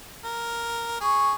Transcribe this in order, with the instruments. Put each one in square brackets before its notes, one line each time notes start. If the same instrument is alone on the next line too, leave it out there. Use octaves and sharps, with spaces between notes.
[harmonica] A#4
[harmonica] G#4 [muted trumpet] C#6